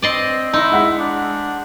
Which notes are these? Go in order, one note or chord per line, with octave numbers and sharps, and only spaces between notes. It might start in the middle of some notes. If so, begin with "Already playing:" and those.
C4 D5 D#5 C6
D#4 E4 C6
G#3 F#5 B6
D4